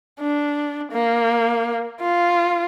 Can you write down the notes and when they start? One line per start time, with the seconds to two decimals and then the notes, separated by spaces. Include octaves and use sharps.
0.20 D4
0.92 A#3
2.01 F4